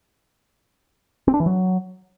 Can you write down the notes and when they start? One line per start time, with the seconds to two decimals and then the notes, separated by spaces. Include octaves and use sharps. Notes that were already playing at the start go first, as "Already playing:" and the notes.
1.28 C4
1.34 D4
1.40 E3
1.46 F#3